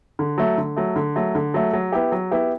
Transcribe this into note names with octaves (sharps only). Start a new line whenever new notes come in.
D3
F#3 A3
D3
F#3 A3
D3
F#3 A3
D3
F#3 A3
F#3
B3 E4 G4
F#3
B3 E4 G4